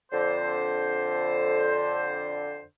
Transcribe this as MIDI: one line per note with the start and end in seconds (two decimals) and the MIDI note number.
0.12 2.61 41
0.12 2.61 50
0.12 2.61 72